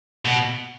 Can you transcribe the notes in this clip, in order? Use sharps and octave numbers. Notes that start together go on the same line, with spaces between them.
B2